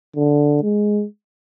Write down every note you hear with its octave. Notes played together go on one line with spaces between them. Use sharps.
D3
G#3